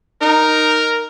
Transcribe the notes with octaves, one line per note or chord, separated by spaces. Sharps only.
D#4 A#4